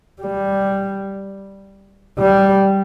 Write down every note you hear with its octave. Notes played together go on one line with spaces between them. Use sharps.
G3
G3